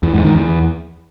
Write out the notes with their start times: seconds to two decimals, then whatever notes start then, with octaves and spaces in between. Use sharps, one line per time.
0.03 E2
0.14 G#2
0.24 D#3
0.35 E2